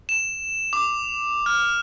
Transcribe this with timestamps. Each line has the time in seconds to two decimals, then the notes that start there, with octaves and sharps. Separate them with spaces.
0.09 E7
0.73 D6
1.46 F6